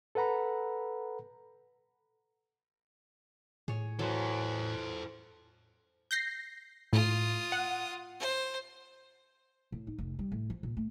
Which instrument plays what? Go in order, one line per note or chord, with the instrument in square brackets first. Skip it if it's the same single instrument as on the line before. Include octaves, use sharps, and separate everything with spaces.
[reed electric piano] A4 B4 F#5 A#5 B5
[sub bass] A2 [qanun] G#4 C#5
[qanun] E3 F#3 [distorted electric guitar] A4 C5
[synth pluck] G6 A#6 C7
[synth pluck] A2 [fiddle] F4 D#6
[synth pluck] F#5
[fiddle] C5
[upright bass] A2
D#4
F1
G3
A2
F3
A#2
A3